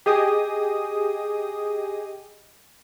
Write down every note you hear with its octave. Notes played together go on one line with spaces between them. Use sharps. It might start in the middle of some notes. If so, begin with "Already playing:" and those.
G4 G#4 D#5 D#6